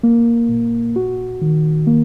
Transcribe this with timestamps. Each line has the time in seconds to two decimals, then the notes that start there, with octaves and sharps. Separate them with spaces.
0.03 A#3
0.49 A#2
0.96 F#4
1.42 D#3
1.87 A#3